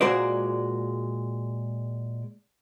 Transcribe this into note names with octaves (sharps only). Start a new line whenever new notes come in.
A#2 G#3 F#4 A#4 C5 D5